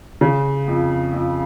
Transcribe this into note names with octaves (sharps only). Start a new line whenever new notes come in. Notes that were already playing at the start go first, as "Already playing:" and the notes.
C#3
F2
F2